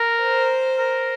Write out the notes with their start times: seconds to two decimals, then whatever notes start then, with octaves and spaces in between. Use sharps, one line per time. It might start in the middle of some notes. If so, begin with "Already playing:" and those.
Already playing: A#4
0.22 C5
0.78 A#4